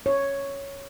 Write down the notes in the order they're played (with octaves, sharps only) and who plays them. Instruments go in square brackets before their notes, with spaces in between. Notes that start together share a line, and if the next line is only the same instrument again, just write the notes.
[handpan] C#5